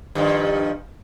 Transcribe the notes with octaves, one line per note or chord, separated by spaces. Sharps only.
G2 D#3 F3